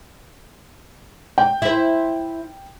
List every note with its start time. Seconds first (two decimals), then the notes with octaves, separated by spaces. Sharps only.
1.38 G5
1.62 E4 C5